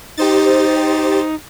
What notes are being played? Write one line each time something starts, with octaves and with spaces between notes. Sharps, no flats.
D#4 G4 C5 A6